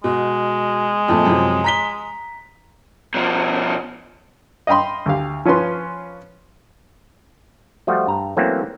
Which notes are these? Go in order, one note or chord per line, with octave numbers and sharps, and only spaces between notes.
B2 G#3
F2 A#2 A3
F#2 C3 F3
A#5 B6 G7
B2 F3
D#5 F5 G5 B5 C6
D2 G4 F5
F3 C#4 F4 B4 C6
F3 G3 A3 F4 F#4
G2 A#5
E3 F#3 A3 A#3 C4 C#4